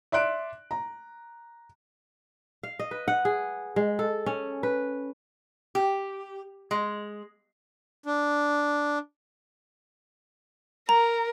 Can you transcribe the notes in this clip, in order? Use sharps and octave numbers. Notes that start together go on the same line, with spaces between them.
D5 E5 C6 F#6 D7
A#5
F5
D#5
B4
F#5
G#4
G#3
A4
C#4
B4
G4
G#3
D4
A#4 A#5